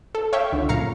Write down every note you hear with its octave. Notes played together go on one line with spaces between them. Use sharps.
A4
C#5 E5 F5 G5 C#6
C#2 D3
F#2 A#2 F5 A#5 C#7